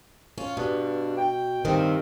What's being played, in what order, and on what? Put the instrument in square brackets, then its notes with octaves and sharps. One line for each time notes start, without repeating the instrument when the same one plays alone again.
[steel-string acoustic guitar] C#4 F4
[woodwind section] G2 D4 [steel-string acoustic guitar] B2
[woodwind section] G5
[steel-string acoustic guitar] G2 C3 D#3 [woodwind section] C4